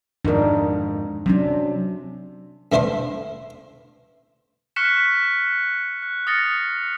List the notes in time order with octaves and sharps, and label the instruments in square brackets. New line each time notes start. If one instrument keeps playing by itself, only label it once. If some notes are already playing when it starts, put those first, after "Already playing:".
[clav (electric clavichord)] F2 G#2 D#3 [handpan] D4 A#4
[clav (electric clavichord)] C3 [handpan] F#3 C#4 D4
[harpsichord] G2 A3 E4 C5 F5 C6
[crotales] C#6 F6 F#6 B6 C#7 E7
F#6
D#6 F6 A6 A#6 C#7